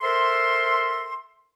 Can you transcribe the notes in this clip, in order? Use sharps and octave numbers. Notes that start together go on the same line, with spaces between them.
A4 A#4 C5 E5 C6